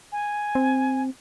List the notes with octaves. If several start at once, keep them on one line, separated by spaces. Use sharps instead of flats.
G#5
C4